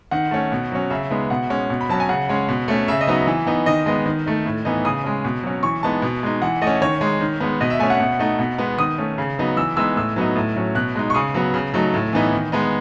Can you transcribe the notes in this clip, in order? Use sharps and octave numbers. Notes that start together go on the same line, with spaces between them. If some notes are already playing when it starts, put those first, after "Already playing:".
D#3 F#5
A3 C#4
B2
F#3 C#4
C#3 E5
G#3 B3 D#4
B2 F#5
G#3 C#4
B2
B5
F#3 C#4 A5
G#5
C#3 F#5
G#3 C#4
B2
A3 C#4
C#3 E5
D#5
F#3 B3 D#4
E3
B3 D#4
D#3 D#5
G#3 B3 D#5
D#3
A3 D#4
A2
E3 B3 D#4
C#3 D#6
G#3 C#4
B2
F#3 C#4
E3 C#6
G#3 B3 D#4 A5
B2
G#3 D#4
E3 F#5
A3 D#5
C#4
D#3 C#5
G#3 D#4
D#3
G#3 B3
B2 D#5
E5
A3 C#4 G#5
F#5
B2
A3 D#4
B2
G#3 B3
D#3 D#6
A3 C#4
C#3
F#3 B3 D#4
E3 E6
G#3 B3 D#4 E6
A2 E6
F#3 B3 D#4
A2
F#3 C#4
B2 F#6
G#3 D#4
C#6
C#3 D#6
F#3 B3
C#3
F#3 A3 D#4
A2
E3 B3 D#4
D#3
G#3 B3 D#4